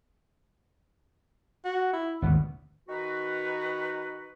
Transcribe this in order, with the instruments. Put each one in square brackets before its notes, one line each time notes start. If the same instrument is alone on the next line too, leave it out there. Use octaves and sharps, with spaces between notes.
[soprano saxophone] F#4
E4
[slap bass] G#1 D2 G2 [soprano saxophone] B3
[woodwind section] D#3 D#4 F#4 B4